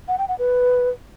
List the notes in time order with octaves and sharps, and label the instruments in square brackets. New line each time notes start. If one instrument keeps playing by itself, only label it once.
[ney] F#5
G5
F#5
B4